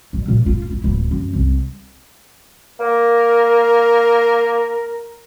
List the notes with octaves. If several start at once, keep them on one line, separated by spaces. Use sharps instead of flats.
F#3
A#2
F4
E4
D1
F#2
C2
A#3 A#4